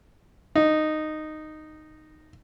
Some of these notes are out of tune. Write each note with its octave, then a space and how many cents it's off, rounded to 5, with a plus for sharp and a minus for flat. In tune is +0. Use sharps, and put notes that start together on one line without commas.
D#4 -10